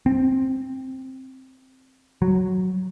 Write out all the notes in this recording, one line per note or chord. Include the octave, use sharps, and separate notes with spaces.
C4
F#3